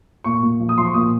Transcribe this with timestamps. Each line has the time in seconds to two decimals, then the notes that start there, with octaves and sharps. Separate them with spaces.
0.24 A#2 C#6
0.43 A#2
0.60 F3
0.69 D#6
0.78 F3 C6
0.86 C#6
0.94 A#2 D#6